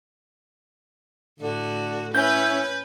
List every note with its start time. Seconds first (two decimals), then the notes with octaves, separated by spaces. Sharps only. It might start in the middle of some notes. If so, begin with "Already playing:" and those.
1.40 A2 D3 F#4
2.15 C#4 E4 B4 G6